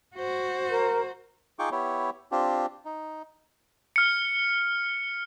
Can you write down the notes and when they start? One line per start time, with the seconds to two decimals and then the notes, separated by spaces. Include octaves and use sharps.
0.16 F#4 C5
0.71 A#4
1.59 D#4 F4 G#4 G5 C#6 D6
1.72 B3 E4 G4 C#5
2.32 C4 D4 F4 G4
2.85 D#4
3.96 F6 C#7